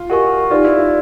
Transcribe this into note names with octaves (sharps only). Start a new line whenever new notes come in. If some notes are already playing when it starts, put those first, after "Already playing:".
Already playing: F4
F#4 G4 A#4 D#5 G#5 C#6
D#4 F4 G4 B4 D5
E4
F4